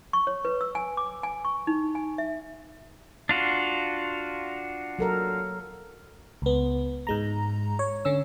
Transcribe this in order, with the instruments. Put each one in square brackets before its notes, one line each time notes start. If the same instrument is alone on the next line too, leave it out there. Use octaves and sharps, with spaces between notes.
[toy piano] C#6
C#5
B4
E6
G#5
D6
G#5
C#6
D#4
G#5
E5
[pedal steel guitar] D4 F4 F#4
[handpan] F#3 A4 A#4
[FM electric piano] C#2 B3
G#2 G#3 A#5
C#5
D3 C#4 E6